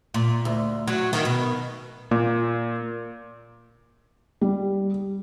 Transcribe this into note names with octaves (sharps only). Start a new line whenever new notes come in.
A#2
D2
F#3
D#3
B2
A#2 A#3
G3